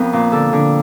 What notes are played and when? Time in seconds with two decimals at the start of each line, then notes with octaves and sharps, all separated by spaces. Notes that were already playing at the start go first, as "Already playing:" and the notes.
Already playing: F2 B3 A#4
0.13 A#2
0.32 D3 A4
0.53 D3